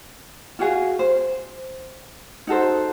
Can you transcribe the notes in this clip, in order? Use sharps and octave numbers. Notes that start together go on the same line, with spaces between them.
F4 F#4 G#4 F5
C5
D#4 F#4 A4 C5